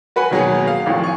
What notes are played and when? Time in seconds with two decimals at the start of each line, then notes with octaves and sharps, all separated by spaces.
0.16 F#4 B4 F#5 G#5 B5
0.31 D#2 B2 F#3 B3 G#4
0.67 F5
0.86 G#1 A2 F3
1.04 G#5 C#6